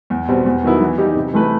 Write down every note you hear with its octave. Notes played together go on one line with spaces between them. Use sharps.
E2
B2 G3 C4
E2
D#3 F#3 B3 E4
E3
G3 D#4 G4
C3
E3 A3 E4 B4